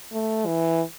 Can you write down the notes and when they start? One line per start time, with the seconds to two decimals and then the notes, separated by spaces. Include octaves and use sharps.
0.13 A3
0.46 E3